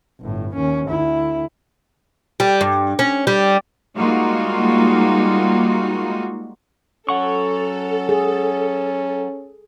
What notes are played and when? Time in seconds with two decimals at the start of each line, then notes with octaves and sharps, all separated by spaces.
0.20 G1 A2
0.55 D#2 C#4
0.87 D2 E4
2.40 G3
2.61 G2
2.99 C#4
3.27 G3
3.96 G3 G#3 A#3 D#4 F4 F#4
7.09 F#3 C#4 A4 F#5 C#6
8.09 G#4